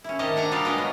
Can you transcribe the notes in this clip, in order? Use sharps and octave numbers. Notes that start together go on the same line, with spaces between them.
C#4 E4
C3 D#3 G4 D#5 G5 A5
D4 F#5 G#5 A#5
G3 D4 D#4 G4 D#5 F5
G#3 B3 D#5 G5 G#5
F#3